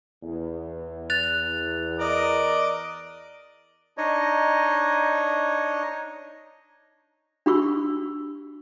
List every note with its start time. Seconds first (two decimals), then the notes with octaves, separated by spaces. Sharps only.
0.23 E2
1.10 F#6 A6 F7
1.99 A#4 D5 D#5
3.98 D4 D#4 C#5 D#5
7.46 D4 F#4 G4 B5 C#6 E6